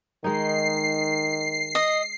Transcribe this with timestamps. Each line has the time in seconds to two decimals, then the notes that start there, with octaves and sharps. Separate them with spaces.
0.24 D#3 G#3 D#4 C7
1.75 D#5